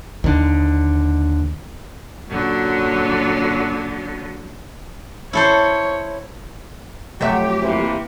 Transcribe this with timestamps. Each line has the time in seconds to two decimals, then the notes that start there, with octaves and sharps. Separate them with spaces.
0.24 D#2 D3
2.27 F#2 A#2 D3 F#3
5.33 E4 A4 C5 C#5
7.21 F2 F#3 A3 G4 E5
7.62 C3 E3 A#3